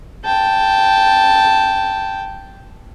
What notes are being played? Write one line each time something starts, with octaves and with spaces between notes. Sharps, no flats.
G5 A5